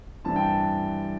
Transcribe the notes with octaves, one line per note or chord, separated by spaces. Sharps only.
G2 E3 C4 A5
G5
A5